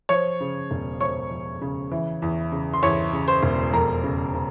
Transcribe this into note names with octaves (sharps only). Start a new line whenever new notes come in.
F3 C#5 C#6
C#3
E1
F3 C#5 C#6
F3
C#3
E3
E2
C#3
C6
E2 C#5 C#6
C#3
C5 C6
E1
F2 A#4 A#5
C#3
C#3